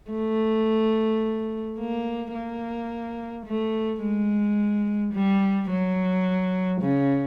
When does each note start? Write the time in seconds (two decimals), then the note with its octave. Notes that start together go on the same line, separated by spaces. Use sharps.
0.11 A3
1.78 A#3
2.34 A#3
3.46 A3
4.02 G#3
5.14 G3
5.70 F#3
6.81 C#3